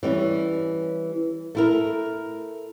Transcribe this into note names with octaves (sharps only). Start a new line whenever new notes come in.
E3 G3 C#4
A3 E4 A#4